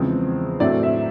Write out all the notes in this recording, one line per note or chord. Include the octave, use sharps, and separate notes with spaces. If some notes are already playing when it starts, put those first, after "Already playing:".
Already playing: E2 C#3 F3 G#3 C4
A2 F#3 A3 C4 D5
E5